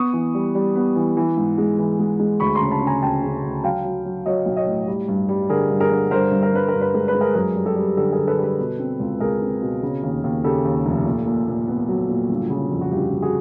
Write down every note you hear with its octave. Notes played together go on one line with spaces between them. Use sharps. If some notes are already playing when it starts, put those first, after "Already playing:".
Already playing: B3 C#6 D#6
E3
G3
G3
B3
E3
E3
G#2
G#3
E3
G#3
G#3
D2 B5 C#6
A#5 C6
C#3
A5 B5
C#3
G#5 A#5
D2 G5 A5
C#3
D2
F#3 F5 G5
F#3
F#3
F#3 C#5 D#5
B1
C#5 D#5
A2
G3
G2
G3
D3 G#4 A#4
G2
G#4 A#4
D3
G2 A#4 C5
G2
A#4
G2 B4
G2 A#4
B4
G#3 A#4
B4
G#3
G#4 A#4
F#2 G#4 A#4
G3
G4 A4
G3
D3 G4 A4
G#4 A#4
D3
A4 B4
G3 A4 B4
B2
C4
C#2
C#2 G#4 A#4
C4
B2
C#3
D#2
D#2
C#3 G4 A4
D#2
F1
A#2
A#2
A#2
B3
F#3
A#2
G1
C#3
F2
F#4
G1 G4
G1
F#4 G#4